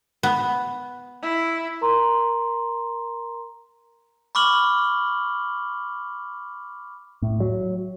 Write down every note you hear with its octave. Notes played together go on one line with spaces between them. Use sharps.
B3
E4
A#4 A#5 C6
B5 C#6 D6 F6 F#7 G7
A2
F#3